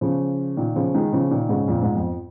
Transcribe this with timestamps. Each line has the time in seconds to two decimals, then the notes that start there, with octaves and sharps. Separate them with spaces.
0.01 C#3 F3
0.57 A#2 D#3
0.76 C#3 F3
0.94 D#3 G#3
1.12 C#3 F3
1.31 A#2 D#3
1.49 G#2 C#3
1.68 F2 A#2
1.82 G#2
1.95 F2